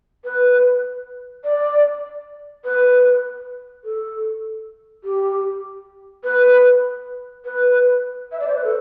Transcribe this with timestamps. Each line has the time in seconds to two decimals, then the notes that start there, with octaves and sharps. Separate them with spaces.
0.24 B4
1.44 D5
2.64 B4
3.84 A4
5.04 G4
6.24 B4
7.45 B4
8.32 E5
8.40 D5
8.48 C5
8.56 B4
8.64 A4